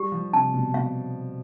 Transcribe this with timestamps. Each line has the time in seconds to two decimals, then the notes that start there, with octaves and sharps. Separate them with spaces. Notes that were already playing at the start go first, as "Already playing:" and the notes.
Already playing: G3 G4
0.12 F3
0.33 C3 A5
0.54 B2
0.74 B2 F5